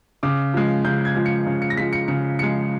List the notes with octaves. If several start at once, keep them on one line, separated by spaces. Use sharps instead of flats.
C#3 D6
F3 G#3
C#3 G6
G#6
F3 G#3
C#7
C#3
C#7
A#6
F3 G#3 B6
C#7
C#3 C#7
F3 G#3 C#7